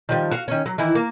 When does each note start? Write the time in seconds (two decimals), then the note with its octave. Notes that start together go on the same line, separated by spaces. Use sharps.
0.09 D#3 F3 G3
0.31 F#4 F5
0.48 D#3 C#4
0.66 F#3
0.78 D#3 E3 E4
0.95 A#3